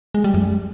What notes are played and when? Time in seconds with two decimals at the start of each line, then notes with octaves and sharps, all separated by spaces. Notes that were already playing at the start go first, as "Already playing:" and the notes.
0.14 G#3
0.24 G3
0.34 F#2